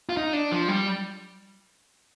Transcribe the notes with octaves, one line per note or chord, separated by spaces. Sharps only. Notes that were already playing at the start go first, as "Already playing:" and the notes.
F4
D#4
D4
F3
G3